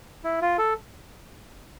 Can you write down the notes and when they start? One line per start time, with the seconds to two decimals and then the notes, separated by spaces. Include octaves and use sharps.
0.24 E4
0.42 F4
0.58 A4